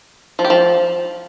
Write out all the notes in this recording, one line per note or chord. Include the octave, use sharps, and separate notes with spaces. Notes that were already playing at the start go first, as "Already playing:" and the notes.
F3
G4
F3